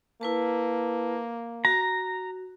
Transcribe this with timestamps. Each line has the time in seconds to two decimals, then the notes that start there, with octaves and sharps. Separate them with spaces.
0.21 A#3 E4 B4 A5
1.65 F#4 A#5